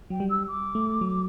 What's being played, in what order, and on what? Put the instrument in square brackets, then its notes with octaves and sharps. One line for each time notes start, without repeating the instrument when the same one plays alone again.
[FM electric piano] F#3 [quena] G5
[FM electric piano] G3
[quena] E6
D6
[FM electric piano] A3
F#3